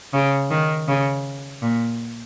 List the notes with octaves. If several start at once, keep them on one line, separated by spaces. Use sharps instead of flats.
C#3
D#3
C#3
A#2